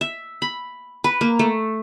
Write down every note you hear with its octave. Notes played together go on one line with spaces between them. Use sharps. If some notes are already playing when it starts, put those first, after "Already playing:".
E5
B5
B4
A#3
A3